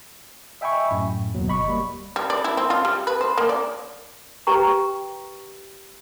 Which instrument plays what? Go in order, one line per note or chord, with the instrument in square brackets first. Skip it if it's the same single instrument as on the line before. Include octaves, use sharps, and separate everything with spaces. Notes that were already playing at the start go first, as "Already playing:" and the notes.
[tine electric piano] D#5 E5 G5 G#5 B5 C#6
F#2 A2
D#2 B2 F#3
G1 D#5 B5 C#6
G3 A#3
[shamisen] G3
D5
E4
C4
F4
G3
B4
C5
A#3
D5
[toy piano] G4 B4 G5 A#5 C#6